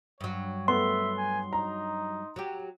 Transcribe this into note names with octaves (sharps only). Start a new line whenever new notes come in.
G2 F#3 C#5
A3 B3 E5 C6
G#5
D#4 A#5
F#3 G4